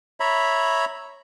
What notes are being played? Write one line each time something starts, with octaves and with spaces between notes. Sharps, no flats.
C#5 E5 A#5 B5